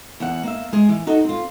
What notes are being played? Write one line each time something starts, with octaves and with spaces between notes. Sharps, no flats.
E2 F#5
A#3 E5
G#3 G#4
E3
D#4 F#4 A4
C4 F4